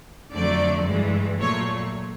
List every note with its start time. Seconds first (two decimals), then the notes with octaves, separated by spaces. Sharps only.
0.33 F2 D3 F#3 A3 D5
0.87 G2 E3 G#3
1.39 A#2 F#3 A3 C#5